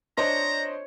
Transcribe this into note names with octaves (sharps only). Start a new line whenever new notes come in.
D4 C5 C#5 D#5 A#5